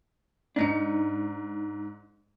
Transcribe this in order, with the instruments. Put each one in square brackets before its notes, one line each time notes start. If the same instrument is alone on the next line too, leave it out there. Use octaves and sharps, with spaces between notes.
[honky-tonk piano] G#2 C#7 [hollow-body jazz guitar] D4 D#4